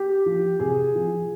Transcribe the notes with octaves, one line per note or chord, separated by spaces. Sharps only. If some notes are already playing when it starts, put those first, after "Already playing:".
Already playing: G4
F3
C3 G#4
F3